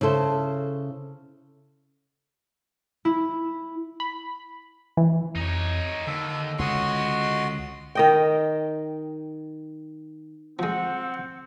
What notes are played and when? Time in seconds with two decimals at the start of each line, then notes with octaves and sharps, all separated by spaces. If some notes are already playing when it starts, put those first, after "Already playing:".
0.01 C#3 E4 A4 C5
3.05 E4
4.00 B5
4.97 E3
5.36 F2 D#4 C#5
6.07 D#2 D3 A4
6.59 C#2 F#4 C#5 D#5 C6
7.95 D#3 D#5 G5
10.59 F3 G#3 C4 F#5